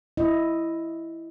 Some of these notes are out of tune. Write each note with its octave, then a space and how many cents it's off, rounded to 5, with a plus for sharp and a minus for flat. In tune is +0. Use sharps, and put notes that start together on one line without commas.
E4 +0 D#5 +0